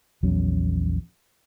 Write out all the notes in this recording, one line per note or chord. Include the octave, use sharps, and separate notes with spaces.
A#1 E2 F#3 C#4